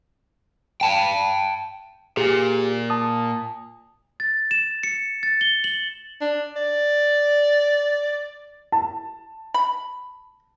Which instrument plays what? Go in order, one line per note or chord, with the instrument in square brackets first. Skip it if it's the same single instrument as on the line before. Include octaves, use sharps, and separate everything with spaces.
[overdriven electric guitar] G5 A5
[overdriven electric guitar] A#2 [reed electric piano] G4 G#4
[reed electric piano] A5 D#6
[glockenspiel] A6
E7
C#7
A6
G7
F#7
[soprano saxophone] D4
D5
[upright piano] A5
[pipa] B5